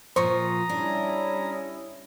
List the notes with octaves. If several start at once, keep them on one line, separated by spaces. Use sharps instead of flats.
A#2 F3 C5 A#5 C#6 D#6
G3 C#4 D4 E4